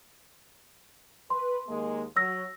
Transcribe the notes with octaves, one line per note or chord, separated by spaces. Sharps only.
B4 C6
D#2 G#3 A#3
F#3 E6 A#6